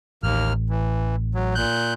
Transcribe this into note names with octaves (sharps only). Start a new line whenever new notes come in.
A1 D#2 A#3 F6
E3
F#3
A#2 F#6 G6